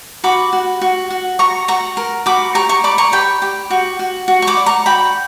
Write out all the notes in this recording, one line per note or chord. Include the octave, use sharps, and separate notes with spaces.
F#4 B5 D6
F#4
F#4
F#4
F#4 A#5 C#6
F#4 A#5 C#6
A#4
F#4 B5 D6
G4 A#5 C#6
A#5 C#6
D5 B5 D6
A#5 C#6
G4 G5 B5
G4
F#4
F#4
F#4
C#6
B5 D6
D5
A#5 C#6
F#4 G5 B5